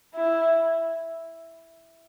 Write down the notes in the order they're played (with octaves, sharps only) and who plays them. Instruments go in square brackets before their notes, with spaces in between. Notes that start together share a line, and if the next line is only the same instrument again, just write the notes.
[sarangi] E4